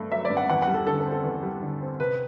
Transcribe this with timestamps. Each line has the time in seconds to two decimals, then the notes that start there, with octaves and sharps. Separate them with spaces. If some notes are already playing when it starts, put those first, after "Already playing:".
Already playing: G2 A3
0.12 F#3 E5
0.25 D5
0.30 G2
0.37 F#5
0.50 E2 F#5
0.62 F#5
0.67 G3
0.74 A4
0.87 D3 A4
1.00 A4
1.06 C4
1.12 A4
1.24 E2
1.43 G3
1.62 D3
1.81 C4
2.00 C3 B4